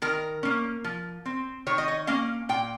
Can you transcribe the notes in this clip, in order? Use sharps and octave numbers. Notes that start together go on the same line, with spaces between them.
D#3 A#4
A#3 C#4
F3
C4
D#3 C#5
D#5
C#5
A#3 C#4 F5
A#2 G5